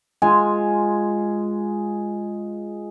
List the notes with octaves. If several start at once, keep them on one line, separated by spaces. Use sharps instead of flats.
G#3 F4 G#5